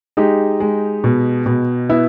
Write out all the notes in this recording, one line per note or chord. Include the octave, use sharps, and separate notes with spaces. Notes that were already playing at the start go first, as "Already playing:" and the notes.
G#3 D#4 G4
G#3
B2
B2
B3 E4